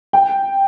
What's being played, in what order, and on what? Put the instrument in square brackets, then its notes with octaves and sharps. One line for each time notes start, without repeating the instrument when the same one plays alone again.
[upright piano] G5